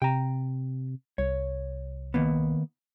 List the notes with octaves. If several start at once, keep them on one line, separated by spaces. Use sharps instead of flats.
C3 G5 A#5
C2 C#5
D#3 A#3 B3